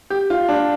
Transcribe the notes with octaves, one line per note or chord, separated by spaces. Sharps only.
G4
F4
D4